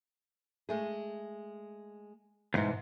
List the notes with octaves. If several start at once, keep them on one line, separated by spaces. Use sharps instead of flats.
G#3 A3 G#4
D#2 G#2 B2 E3 C5